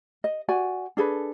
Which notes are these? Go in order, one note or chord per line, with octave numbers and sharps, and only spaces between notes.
D#5
F#4 D5 G#5
D4 G#4 A4 B4